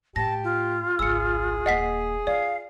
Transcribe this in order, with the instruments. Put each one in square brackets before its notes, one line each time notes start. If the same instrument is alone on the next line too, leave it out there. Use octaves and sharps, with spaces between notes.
[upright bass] A2 [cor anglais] G4 [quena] A5 [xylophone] A#6
[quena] F4
[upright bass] G#1 C#2 [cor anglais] G#4 [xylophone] E6 C#7
[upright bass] D#1 A#3 [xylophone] D#5 F#5 B6
[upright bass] F4 [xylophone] D5 [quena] F5